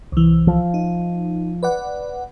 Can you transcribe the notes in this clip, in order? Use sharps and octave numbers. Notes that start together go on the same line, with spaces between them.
C2 E3
F3
D#4
B4 D5 F#5